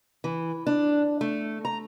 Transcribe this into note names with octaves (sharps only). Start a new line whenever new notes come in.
E3
D4
A3
A#5